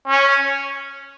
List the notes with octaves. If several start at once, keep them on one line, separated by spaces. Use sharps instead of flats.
C#4